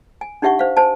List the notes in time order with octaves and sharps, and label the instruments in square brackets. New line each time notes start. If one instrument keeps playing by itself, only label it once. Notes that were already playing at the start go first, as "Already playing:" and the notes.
[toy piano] G#5
D4 D#4 G4 E5 F#5 C#6
C5 F5
C5 G#5 A5